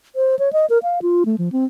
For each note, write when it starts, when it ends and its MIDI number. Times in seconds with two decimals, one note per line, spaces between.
0.16 0.35 72
0.39 0.52 73
0.53 0.66 75
0.70 0.78 70
0.83 0.99 77
1.02 1.23 65
1.26 1.36 57
1.38 1.49 53
1.52 1.65 60